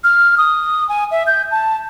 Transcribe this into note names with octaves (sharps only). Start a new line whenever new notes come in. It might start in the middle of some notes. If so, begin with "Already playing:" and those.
F6
D#6
G#5
E5
G6
A5